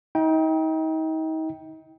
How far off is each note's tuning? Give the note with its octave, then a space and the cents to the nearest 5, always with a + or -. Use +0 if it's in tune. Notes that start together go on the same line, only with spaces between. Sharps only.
D#4 +35 G5 +0